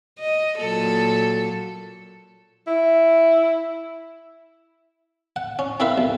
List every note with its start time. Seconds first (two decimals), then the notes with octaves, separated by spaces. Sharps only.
0.19 D#5
0.59 A#2 F#3 A4
2.67 E4
5.36 F#5
5.59 C#4
5.80 C4 E4 A#4 B4 E5 F5
5.98 B1